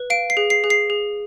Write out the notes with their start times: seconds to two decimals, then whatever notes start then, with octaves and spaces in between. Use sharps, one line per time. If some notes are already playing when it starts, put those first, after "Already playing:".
Already playing: B4
0.10 F5 D7
0.30 C7
0.37 G#4
0.50 C7
0.64 G#4
0.70 C7
0.90 G#4